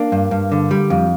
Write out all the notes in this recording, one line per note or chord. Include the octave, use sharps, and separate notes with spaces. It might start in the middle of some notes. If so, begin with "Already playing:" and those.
Already playing: A#3 D4
G2
G2
D3
G3
F2